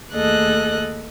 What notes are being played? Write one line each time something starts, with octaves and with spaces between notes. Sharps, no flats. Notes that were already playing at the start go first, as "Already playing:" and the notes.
D#2 A3 G#4 A4 D#5 F#6